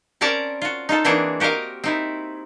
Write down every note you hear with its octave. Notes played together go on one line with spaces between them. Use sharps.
C4 C#4 A#4 D5 A5 A#5
F4 F#4
D#4 F4 A4
E3 A#3 C4 D4 F#4 G#4
F#4 G4 A#4 D#5 F5
C4 D#4 E4